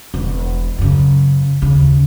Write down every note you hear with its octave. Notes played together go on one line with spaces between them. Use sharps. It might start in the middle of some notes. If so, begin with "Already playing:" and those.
E1
F#2 C#3
D#2 C#3